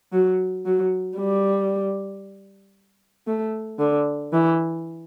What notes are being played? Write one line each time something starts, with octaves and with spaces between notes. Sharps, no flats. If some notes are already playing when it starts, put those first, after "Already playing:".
F#3
F#3
G3
A3
D3
E3